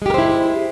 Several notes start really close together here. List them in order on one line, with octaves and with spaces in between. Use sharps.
G#3 G4 A#4 C5 E4